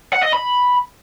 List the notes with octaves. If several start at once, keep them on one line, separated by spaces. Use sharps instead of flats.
F#5
D#5
B5